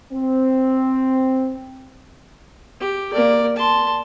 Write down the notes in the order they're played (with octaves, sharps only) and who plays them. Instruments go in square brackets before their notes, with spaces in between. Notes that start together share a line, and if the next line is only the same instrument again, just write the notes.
[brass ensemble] C4
[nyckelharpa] G4
A#3 D5
A5 C6